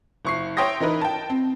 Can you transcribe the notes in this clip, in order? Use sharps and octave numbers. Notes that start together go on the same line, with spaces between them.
F#1 C#6 C7
C#5 E5 G5 C6 D#6 A#6
E3 D#4 A#4 B4
G5 A5
C4